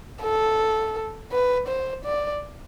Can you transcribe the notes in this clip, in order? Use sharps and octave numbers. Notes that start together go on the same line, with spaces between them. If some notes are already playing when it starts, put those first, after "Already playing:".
A4
B4
C5
D5